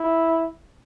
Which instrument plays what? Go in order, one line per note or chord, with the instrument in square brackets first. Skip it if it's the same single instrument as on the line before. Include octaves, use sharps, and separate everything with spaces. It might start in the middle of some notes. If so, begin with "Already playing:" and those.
Already playing: [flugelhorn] E4